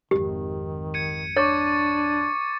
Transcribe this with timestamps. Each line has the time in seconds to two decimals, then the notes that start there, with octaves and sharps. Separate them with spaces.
0.11 G#1 F2 D#3 G4
0.94 G#6 C#7 D#7
1.36 D4 C#5 C#6 D6 A6